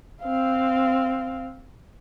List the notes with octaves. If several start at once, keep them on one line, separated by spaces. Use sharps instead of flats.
C4 F5